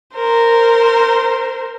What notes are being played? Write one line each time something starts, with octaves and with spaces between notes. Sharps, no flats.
A#4 C5